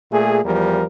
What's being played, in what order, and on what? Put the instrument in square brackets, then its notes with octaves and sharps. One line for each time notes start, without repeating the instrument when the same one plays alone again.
[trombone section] A#2 A3 G#4
E2 F3 G3 A#4